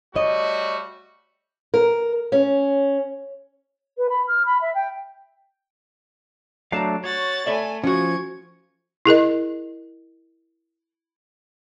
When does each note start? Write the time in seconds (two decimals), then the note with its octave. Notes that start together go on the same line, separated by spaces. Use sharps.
0.16 G3 A3 F#4 C#5 D#5
1.74 A#4
2.32 C#4
3.97 B4
4.09 B5
4.27 F6
4.45 B5
4.61 E5
4.74 G5
6.72 F#3 A3 D4 F5 A5 A#5
7.04 F#4 C#5 A6
7.46 A3 D5 E5 G#5 B5
7.84 F3 C#4 F#4 C#6 G#6
9.06 E4 G#4 A#4 D#5